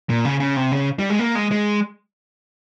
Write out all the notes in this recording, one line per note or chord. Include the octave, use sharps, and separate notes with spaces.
A#2
C#3
C#3
C3
C#3
G3
G#3
A#3
G#3
G#3